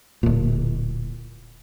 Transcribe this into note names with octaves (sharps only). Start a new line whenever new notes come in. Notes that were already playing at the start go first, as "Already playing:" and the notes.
D1 A#2